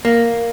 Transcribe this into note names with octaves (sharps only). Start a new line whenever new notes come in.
A#3